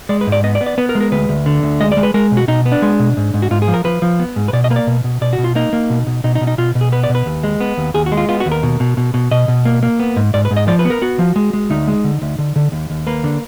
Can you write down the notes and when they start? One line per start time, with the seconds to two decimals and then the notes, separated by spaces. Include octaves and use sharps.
0.09 G#3 D5
0.21 B4
0.27 G#2
0.32 D5
0.44 B3 D#5
0.55 D5
0.61 B3
0.66 D5
0.78 B3 B4
0.89 A#4
0.95 G#3
1.01 A#4
1.12 D2 B4
1.29 D2
1.46 D3
1.63 D2
1.81 G#3 D#5
1.92 D5
1.97 G#3
2.03 B4
2.14 G#3 A#4
2.31 B2
2.37 F#4
2.48 B2 D#4
2.66 B3
2.72 D4
2.82 G#3
3.00 B2
3.17 G#2
3.34 G#2
3.42 F#4
3.51 G#2 F4
3.62 G#4
3.68 F3
3.74 A#4
3.85 F3 B4
4.02 F3
4.20 B3
4.36 G#2
4.48 B4
4.53 B2 D5
4.64 D#5
4.70 A#3 B4
4.76 D5
4.87 B2
5.04 B2
5.21 B2 D5
5.33 F#4
5.39 B2
5.44 F4
5.55 A#3 D#4
5.73 A#3
5.90 B2
6.07 B2
6.24 B2 D#4
6.35 D#4
6.41 B2
6.47 D#4
6.58 B2 F4
6.75 B2
6.81 G#4
6.92 B3 B4
7.04 D5
7.09 B2
7.15 B4
7.26 D#2
7.43 G#3
7.60 B3
7.77 D#2
7.94 D#2 G#4
8.06 F#4
8.12 G#3
8.17 F4
8.29 B3 F4
8.40 F#4
8.46 D#2
8.52 A#4
8.63 B2
8.80 B2
8.97 B2
9.14 B2
9.31 B2 D#5
9.48 B2
9.65 A#3
9.83 A#3
10.00 B3
10.16 G#2
10.34 G#2 D5
10.45 B4
10.51 G#2
10.56 D#5
10.68 F3 D5
10.79 B4
10.85 B3
10.90 A#4
11.02 B3 F#4
11.19 F3
11.36 G#3
11.53 G#3
11.70 D2 D#4
11.88 G#3
12.04 D3
12.22 D2
12.39 D3
12.56 D3
12.72 D#2
12.90 D#2
13.07 A#3 B4
13.24 D3